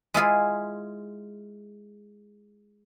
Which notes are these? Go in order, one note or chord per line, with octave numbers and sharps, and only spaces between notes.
G#3 E4 F4 G#4